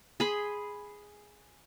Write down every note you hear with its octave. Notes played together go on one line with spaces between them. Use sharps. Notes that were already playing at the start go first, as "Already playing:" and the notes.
G#4 B5 C6